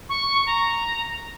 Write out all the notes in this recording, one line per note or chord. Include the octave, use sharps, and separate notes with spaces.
C#6
A#5